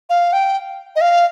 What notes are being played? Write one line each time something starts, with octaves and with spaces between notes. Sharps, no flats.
F5
G5
D#5
F5